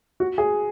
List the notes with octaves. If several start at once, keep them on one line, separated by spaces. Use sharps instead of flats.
F#4
G#4